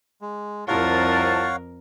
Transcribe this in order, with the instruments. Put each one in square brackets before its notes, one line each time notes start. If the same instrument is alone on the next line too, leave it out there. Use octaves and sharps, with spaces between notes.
[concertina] G#3
[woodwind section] C2 F4 A5 [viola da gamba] F2 A#4 [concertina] C#5 F5 F#5